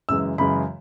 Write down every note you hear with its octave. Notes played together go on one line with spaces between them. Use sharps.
F#2 C#3 E3 G#3 E6
F#2 C#3 E3 G#3 B5